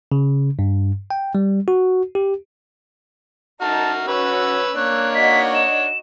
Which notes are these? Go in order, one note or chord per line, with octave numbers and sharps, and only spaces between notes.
C#3
G2
G5
G3
F#4
G4
D#4 F#4 A#4 A5 F6
C#4 F#4 B4 C#5 E6
A#3 D4 C#5 F#6
D#4 F#4 D#5 B6
E7